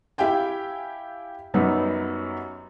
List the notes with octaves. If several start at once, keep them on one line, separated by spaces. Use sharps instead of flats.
E4 G4 F5 G5 G#5
F#2 F#3 G3 B3 D#4